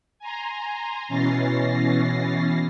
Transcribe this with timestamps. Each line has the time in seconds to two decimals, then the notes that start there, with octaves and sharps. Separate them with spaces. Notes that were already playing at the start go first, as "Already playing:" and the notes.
0.19 G#5 A#5 C6
1.08 B2 E3 C#4 A6 A#6 C7